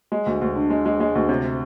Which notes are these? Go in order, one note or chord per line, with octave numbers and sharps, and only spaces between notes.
G#3
D2
D2
D3
G#3
G#3
G#3
D2
C3